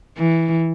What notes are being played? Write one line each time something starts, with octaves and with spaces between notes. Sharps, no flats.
E3